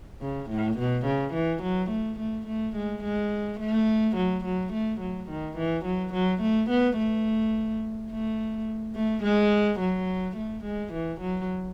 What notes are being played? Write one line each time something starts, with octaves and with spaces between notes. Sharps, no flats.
C#3
A2
B2
C#3
E3
F#3
A3
A3
A3
G#3
G#3
A3
F#3
F#3
A3
F#3
D#3
E3
F#3
F#3
A3
B3
A3
A3
A3
G#3
F#3
A3
G#3
E3
F#3